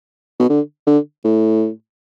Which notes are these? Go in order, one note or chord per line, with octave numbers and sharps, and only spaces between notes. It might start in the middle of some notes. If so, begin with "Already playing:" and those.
B2
D3
D3
A2